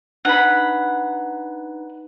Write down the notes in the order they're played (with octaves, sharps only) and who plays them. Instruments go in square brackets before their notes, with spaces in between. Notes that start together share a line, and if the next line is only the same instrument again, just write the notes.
[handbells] D4 D#4 B4 [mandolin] F#5 B5